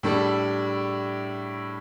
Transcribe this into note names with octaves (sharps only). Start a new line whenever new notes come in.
A2 G3 D4 A4